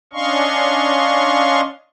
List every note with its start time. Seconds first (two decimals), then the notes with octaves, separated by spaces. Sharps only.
0.13 C#4 D4 D#5 F5 C6 C#6